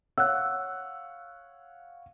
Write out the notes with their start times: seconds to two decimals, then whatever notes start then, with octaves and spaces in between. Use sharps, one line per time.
0.18 C#5 F5 F#5 E6 F#6